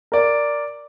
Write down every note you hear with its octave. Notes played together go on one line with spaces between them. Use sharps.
A#4 D5